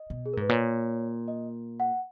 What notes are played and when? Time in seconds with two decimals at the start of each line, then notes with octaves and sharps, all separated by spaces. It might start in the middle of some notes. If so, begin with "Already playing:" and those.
Already playing: D#5
0.10 B2
0.26 G#4
0.33 A#4
0.37 G#2 B4
0.49 A#2 C#5
1.28 D#5
1.80 F#5